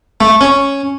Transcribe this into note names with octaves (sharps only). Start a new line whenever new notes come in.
A3
C#4